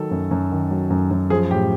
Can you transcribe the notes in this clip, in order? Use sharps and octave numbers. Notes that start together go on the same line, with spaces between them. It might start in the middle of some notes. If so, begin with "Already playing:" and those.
Already playing: D#3 F#3 A4
F#2
F#2
D#3
F#3
F#2
F#2
F3 G#4
A2 G4